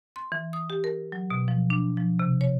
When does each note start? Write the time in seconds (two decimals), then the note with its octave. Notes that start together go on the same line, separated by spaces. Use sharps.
0.16 C6
0.32 E3
0.53 D#6
0.70 G4
0.84 A#4
1.12 F#3
1.31 B2
1.48 F3
1.70 D4
1.97 F3
2.19 C3
2.41 C#5